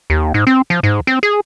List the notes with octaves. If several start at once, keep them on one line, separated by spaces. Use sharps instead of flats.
D#2
G#2
C4
F3
G#2
C4
G#4